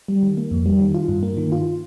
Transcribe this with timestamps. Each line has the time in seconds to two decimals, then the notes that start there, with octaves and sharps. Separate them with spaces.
0.08 G3
0.23 D#3
0.37 A#3
0.51 F2
0.66 G3
0.79 D#3
0.94 F4
1.08 G2
1.23 A#3
1.37 D#3
1.52 F4